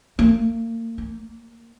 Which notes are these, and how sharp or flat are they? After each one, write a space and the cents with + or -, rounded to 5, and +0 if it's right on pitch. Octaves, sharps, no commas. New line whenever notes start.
A#3 -35
A#3 -10